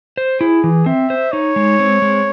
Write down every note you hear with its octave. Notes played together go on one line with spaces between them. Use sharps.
C5
E4 G#4
E3
C4 E5
C5
D#4 C#5
G#3
C4
G#3